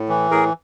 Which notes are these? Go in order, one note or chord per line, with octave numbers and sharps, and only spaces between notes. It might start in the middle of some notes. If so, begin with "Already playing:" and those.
Already playing: A2
E3
A2 G#4 A#4